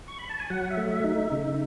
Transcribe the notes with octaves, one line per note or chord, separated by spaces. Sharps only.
C#6
B5
A5
G#5
F#3 F#5
E5
A3
E5
D#4
E5
C#3